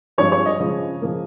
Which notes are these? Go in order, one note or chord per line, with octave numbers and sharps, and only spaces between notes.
G2 F3 G#3 C4 C#5
C#5
D#5
C#3 F3 G#3
C#3 F3 A#3